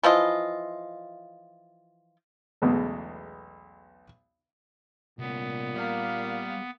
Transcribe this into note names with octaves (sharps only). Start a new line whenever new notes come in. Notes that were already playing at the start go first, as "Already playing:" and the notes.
E3 F3 F4 D#5
B1 E2 C#3 G#3 A3
C2 A#2 B3 C#4
G3 A#3 F5